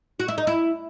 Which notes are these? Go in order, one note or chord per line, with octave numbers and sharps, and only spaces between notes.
F#4
E4
D#4
E4